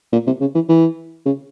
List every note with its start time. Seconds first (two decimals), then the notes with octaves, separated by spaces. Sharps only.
0.13 A#2
0.26 C3
0.40 C#3
0.55 E3
0.69 E3
1.26 C#3